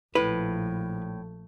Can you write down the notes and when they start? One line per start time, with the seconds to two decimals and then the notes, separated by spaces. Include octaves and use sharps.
0.15 A#1 A2 F3 B4